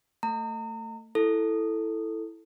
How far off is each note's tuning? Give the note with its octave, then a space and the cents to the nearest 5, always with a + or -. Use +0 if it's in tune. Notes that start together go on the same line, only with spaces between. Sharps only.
A3 +20 A#5 -35
E4 +0 A4 +0